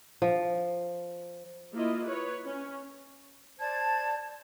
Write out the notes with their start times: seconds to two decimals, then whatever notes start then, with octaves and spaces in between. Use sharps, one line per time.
0.22 F3
1.74 A#3 E4 F4 D#5
2.04 B4 C#5
2.45 C#4
3.60 C5 D5 A5 G#6